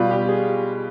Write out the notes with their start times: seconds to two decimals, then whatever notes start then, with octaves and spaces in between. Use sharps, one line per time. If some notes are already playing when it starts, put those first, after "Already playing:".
Already playing: B2 G3 F4
0.11 G4
0.29 G#4